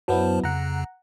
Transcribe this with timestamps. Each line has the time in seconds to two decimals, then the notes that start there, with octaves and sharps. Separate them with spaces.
0.08 F#2 F#3 B3 E4 C5 A5
0.44 F2 C#3 F#5 A#5